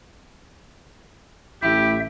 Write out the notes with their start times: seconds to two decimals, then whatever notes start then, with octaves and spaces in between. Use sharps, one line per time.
1.63 A1 A2 E4 G4 E5